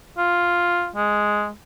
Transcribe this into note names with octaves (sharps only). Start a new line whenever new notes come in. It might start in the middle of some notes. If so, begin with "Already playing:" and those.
F4
G#3